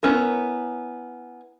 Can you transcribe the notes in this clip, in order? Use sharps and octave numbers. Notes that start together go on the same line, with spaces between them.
B3 C#4 E4 A#4